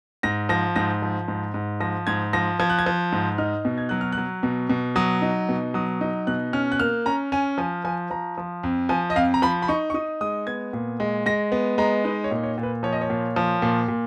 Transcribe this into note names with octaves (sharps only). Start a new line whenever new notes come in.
G#2 A#6
F3 A#6
G#2 A#6
F3
G#2
G#2
F3 A#6
G#2 G#6
F3 A#6
F3 G#6
F#6
G#6
F3
G#2
D#4 F6
B2
G#6
F#3 F#6
F6
F#6
F#3
B2
B2
F#3 D#6
D#4
B2
F#3 D#6
D#4
B2 F#6
C#4 F6
F#6
A#3 F6
C#4 A#5
C#4 G#5
F3 G#5
F3 G#5
F3 A#5
F3
F2
F3 G#5
D#5
F2 F5
A#5
F3 B5
B5
D#4 C#6
C#6
D#4 D#6
G#3 D#6
B3 G#6
A#2
G#3
G#3 A#6
B3
G#3 A#5
D#4 B4
C#5
A#2
C#5
A#2
B4
F3 C#5
D#5
C#5
A#2
F3
A#2
A#2